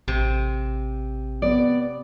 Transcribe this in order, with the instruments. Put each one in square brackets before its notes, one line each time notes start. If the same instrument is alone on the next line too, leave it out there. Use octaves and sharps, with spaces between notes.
[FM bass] A1 [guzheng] C3
[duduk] B3 [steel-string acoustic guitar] D5